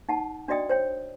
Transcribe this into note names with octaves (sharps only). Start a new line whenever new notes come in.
D#4 F#5 A5
D4 F#4 D5 D#5 G5 D#6
C5 C#5 G5